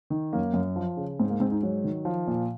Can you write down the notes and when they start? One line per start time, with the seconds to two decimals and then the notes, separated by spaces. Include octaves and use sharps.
0.10 D#3
0.33 F#2 A#3
0.54 F#2
0.76 F3
0.97 C#3
1.19 G#2 C4
1.30 A#3
1.40 G#2 C4
1.51 D#4
1.63 F#3
1.84 D#3
2.05 F3
2.27 A#2